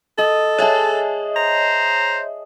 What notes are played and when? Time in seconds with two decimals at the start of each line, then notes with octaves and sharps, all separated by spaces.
0.18 A4 D#5
0.58 G#4 C#5 D#5 E5 A5
1.36 C5 A#5